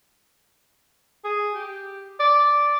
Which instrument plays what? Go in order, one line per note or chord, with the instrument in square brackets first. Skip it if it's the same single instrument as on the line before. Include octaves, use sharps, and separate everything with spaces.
[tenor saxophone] G#4
G4
D5